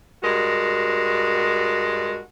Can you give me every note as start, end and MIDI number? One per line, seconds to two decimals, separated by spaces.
0.23 2.19 43
0.23 2.19 56
0.23 2.19 66
0.23 2.19 70